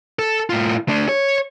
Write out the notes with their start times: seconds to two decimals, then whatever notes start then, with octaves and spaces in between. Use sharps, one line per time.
0.19 A4
0.50 A2 F4
0.88 A3 D4
1.09 C#5